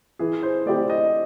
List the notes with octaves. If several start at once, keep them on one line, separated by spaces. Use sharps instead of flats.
E3 G#4
C5
A3 C4 E4 G4 D5
D#5